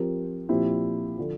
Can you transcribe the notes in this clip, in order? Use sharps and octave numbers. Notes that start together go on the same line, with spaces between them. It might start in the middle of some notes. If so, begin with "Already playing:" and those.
Already playing: F3 C4 G4 A#4
A#2 F3 C4 E4 G4
D3 F3